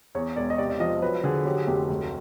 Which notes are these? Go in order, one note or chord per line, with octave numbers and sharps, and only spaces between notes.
E2 C#5
E1 D5
D#5
C3 D5
D5
F3 D#5
F#3 B4
D3 G#4
F#3 G4
G#4
F1 G4
D2